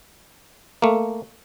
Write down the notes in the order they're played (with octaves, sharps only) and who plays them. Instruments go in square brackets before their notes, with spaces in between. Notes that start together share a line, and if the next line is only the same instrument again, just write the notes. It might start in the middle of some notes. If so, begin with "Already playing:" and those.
[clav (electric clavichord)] A3 A#3